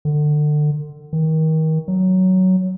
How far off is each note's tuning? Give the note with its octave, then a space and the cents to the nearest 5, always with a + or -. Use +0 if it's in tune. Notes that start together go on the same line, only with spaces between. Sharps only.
D3 +30
D#3 +30
F#3 +10